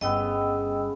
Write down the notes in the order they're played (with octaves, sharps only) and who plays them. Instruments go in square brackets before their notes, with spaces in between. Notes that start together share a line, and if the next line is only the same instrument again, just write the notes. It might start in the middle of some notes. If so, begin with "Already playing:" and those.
[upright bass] G1 G3 [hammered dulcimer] C#3 B3 [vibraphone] D#5 G5 E6